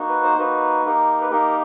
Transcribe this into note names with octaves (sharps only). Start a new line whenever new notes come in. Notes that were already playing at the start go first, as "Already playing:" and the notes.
Already playing: A#3 D#4 F#4
B4
C5
A#3 D#4 F#4 B4
A#3 D#4 G4 A#4
B4
A#3 D#4 G4 A#4